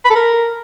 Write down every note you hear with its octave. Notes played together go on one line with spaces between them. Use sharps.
B5
A4
A#4